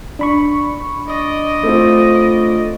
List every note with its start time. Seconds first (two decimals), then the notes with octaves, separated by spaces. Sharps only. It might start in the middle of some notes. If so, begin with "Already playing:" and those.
0.19 D4 B5 C#6
1.07 D5 D#5
1.63 A3 C4 F4